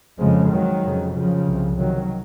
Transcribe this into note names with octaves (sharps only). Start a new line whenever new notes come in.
F2 C#3 F3 G#3
D#3 F#3
F2 C#3
C#3 F3
C2 C3
D#3 F#3